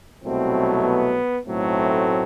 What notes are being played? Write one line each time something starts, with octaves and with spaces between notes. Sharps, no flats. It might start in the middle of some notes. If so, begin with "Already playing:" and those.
C2 B2 F#3 A3 C4
B3
B1 A2 F#3 A3 C4